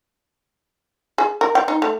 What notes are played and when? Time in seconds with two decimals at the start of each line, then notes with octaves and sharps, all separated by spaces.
1.18 G#4
1.41 A#4
1.55 G5
1.68 D#4
1.82 A3